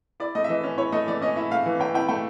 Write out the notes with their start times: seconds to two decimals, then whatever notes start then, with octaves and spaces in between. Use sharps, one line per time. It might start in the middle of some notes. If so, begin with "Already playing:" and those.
0.20 E4 D5
0.35 A3 D#5
0.44 E5
0.49 E3 D#5
0.64 C#4
0.78 E4 C#5
0.92 A3 D#5
1.07 E3 D5
1.22 C#4 D#5
1.36 E4 E5
1.51 A3 F5
1.66 E3
1.79 C#4 G5
1.94 E4 G5
2.09 A3 G5